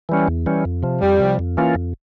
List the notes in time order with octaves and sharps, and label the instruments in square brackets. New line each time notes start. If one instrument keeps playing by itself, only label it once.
[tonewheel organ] E3 G3 C#4
E2
E3 G3 C#4
F2
C3 F3
[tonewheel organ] F2 [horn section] G3
[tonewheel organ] C3 F3
F2
E3 A#3 C#4 F4
F2